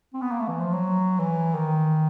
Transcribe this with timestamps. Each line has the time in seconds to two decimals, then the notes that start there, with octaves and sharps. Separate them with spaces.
0.14 C4
0.22 B3
0.32 A#3
0.40 A3
0.48 E3
0.61 F3
0.73 F#3
1.19 E3
1.55 D#3